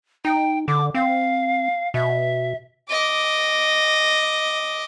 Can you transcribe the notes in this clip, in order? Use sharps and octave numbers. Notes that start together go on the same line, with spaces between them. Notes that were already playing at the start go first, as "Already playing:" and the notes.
D#4 G5
D3 D6
C4 F5
B2 E5
D#5 D6